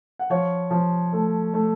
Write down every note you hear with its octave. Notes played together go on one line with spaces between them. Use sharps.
F#5
F3 C#5 F5
F3
A3
A3